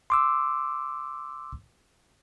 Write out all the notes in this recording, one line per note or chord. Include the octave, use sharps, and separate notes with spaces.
C6 D6 E6